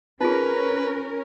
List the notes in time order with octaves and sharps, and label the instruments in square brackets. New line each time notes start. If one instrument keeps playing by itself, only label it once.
[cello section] C#4 A#4 [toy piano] D#4 F4 G#4 [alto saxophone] B4